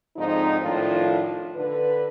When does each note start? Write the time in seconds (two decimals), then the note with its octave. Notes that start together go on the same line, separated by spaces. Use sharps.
0.17 G#2 D3 F3 C4 D#4
0.61 A2 D#3 F3 D4 F4
1.56 D3 B4